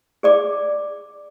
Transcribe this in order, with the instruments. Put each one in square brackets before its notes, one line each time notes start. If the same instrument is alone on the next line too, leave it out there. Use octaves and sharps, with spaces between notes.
[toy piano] G#4 D5 D6